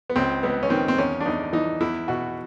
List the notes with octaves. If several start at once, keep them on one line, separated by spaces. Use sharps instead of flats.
B3
C#2 C4
C#2 B3
C#4
D#3 C4
C4
E2 C#4
D4
E2 D#4
E3 D#4
E2 E4
B2 F#4